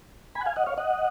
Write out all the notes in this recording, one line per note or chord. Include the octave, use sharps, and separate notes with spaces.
G#5 B5
F#5
F5 G#5
D#5 F#5
C#5 F5
D#5 F#5